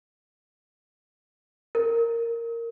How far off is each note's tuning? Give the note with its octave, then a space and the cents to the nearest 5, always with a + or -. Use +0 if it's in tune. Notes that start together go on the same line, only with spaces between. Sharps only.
A#4 -10